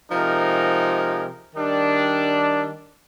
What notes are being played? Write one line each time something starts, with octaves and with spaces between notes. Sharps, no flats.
C3 F3 G#3 D#4 A#4
D#3 G3 D4